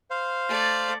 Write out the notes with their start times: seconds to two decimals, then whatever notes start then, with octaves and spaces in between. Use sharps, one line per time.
0.10 C5 F5
0.48 A3 D5